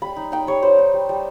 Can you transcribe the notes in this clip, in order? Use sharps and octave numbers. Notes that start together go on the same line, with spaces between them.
G3 B5
D#4
D#4 G5
G3 C#5
G3 C5
D#4
G3
G3